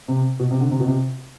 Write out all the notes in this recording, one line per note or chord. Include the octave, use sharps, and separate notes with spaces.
C3
B2
C3
D3
C3
B2
C3